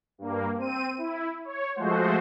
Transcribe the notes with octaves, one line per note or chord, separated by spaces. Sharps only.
G2 A#3
C4 D#7
E4
C#5
F3 G#3 A3 F#4 C5